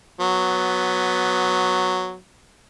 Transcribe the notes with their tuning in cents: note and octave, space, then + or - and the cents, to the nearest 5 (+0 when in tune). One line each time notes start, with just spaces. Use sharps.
F#3 -5 B3 +5